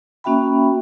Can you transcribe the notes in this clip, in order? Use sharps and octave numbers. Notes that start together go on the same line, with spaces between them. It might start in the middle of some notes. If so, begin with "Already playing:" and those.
A#3 C#4 F#4 E5 G5 B5